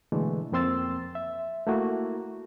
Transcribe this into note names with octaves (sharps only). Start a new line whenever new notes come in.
B2 D3 E3 G#3 A3
F2 A#3 C4 C6 E6 A6
E5
A3 A#3 E4 F#4